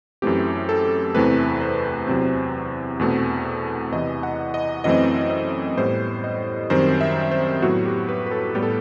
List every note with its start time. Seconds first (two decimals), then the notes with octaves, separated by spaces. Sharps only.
0.22 F#2 E3 A3 C4 G4
0.69 A4
1.14 E2 C3 E3 A3 C4 B4
1.61 C5
2.07 E2 C3 F#3 C4
2.99 E2 B2 A3 C4
3.92 E2 C3 E3 D#5
4.23 F#5
4.54 D#5
4.84 F#2 E3 A3 C4 D#5
5.31 D#5
5.77 A2 G3 B3 C5
6.24 D#5
6.70 F#2 D#3 G3 C4 C5
7.01 E5
7.31 C5
7.62 A2 F#3 B3 F#4
7.85 G4
8.09 B4
8.26 B4
8.31 A4
8.55 A2 G3 B3 G4
8.62 A4